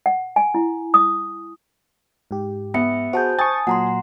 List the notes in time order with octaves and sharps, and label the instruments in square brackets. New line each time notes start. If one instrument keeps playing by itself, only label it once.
[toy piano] F#5
G#5
E4
D#6
[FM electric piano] G#2 G4
[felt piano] B3 [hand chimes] E5 C#7
[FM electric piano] F#4 G#4 [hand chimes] C5 A5 G6
[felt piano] G#5 [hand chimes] A5 D#6 [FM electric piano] C#6 A6
[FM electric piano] A#2 F#3 [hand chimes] F#5 A#5 C6